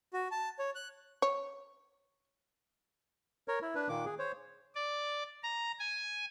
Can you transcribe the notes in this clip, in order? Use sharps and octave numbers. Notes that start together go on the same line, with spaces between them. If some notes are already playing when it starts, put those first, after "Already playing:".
F#4
A5
C#5
F#6
C#5
A#4 C#5
E4
D4 B4
A#2 D#3 A#3 D6
G#4
C5 C#5
D5
A#5
G#5